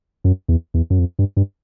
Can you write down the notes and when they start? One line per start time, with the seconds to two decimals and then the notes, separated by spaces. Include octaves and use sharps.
0.24 F#2
0.49 E2
0.74 E2
0.90 F#2
0.99 F2
1.19 G2
1.37 G2